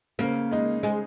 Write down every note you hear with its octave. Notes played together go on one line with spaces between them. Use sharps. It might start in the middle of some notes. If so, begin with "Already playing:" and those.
C#3 A#3
G#3 D#4
G#3